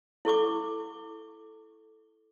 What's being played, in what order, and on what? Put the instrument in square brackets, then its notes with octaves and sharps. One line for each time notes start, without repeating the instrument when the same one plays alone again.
[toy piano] E4 A4 C#6 D6